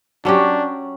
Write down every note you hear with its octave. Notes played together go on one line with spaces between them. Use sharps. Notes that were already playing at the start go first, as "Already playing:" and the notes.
F#3 C#4 D4 G4